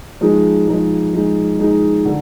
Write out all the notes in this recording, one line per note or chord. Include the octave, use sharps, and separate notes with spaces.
F3 G#3 D#4
F3 G#3 D#4
F3 G#3 D#4
F3 G#3 D#4
D3